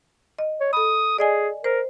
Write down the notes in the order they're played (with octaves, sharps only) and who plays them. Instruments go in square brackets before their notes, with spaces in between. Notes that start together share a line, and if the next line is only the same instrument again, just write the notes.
[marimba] D#5
[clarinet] C#5
[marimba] A4 B5 [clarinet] D#6
[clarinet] G#4 [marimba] D5 D#5 G#5
[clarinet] A#4 [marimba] C5